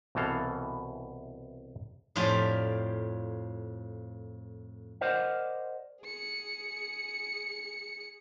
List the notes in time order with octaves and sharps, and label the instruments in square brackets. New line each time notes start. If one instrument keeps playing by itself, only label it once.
[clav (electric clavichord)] C2 B2 E3 A4 F5
[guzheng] F2 A2 F4 G4 D5 G#5
[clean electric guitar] A#4 C5 D5 D#5 F#5
[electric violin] G#4 C#7